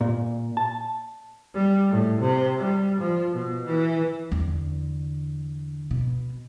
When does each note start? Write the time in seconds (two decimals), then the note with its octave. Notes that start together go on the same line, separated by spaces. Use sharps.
0.01 A#2
0.57 A5
1.54 G3
1.90 A2
2.20 C3
2.58 G3
2.99 F3
3.32 B2
3.66 E3
4.32 E2 D3
5.91 B2